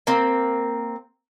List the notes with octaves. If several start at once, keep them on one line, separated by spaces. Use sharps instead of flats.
A#3 C4